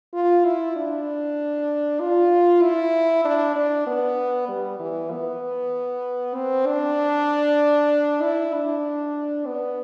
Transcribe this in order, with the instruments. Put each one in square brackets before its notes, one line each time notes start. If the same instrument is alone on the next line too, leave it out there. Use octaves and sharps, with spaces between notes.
[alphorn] F4
E4
D4
F4
E4
D4
D4
B3
G3
E3
B3
C4
D4
E4
D4
B3